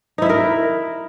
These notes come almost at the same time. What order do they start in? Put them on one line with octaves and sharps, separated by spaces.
D#4 E4 E5 A#4